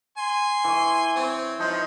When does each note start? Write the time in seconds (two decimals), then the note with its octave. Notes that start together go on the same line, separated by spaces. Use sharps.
0.18 G#5 C6
0.64 E3 C#6
1.16 C4 C#5
1.59 F3 D#4 B4 C5